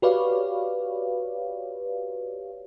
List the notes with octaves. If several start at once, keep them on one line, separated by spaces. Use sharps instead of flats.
F#4 G4 B4 C#5 D5 F5